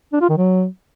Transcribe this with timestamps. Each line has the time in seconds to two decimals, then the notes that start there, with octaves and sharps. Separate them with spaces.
0.13 D4
0.21 F4
0.29 D#3
0.37 F#3